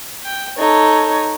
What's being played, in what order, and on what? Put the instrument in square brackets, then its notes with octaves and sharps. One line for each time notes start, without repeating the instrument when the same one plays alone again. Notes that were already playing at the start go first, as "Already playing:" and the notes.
[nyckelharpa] G5
[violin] D#4 C#5 [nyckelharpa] A4